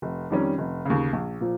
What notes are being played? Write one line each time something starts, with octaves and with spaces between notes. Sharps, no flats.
F1
F2 D#3 G3 C#4
F1
D#2 C#3
A#1
A#2 F3